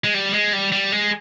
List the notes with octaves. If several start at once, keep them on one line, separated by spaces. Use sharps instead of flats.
G#3
G3
G#3
G3
G3
G#3